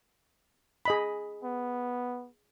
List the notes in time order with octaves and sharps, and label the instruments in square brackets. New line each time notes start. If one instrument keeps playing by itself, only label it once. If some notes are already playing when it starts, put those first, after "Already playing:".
[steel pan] G#4 D#5 B5
[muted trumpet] B3